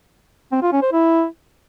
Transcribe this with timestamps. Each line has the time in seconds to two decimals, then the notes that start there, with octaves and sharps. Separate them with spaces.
0.52 C4
0.62 F4
0.72 C#4
0.83 C5
0.93 E4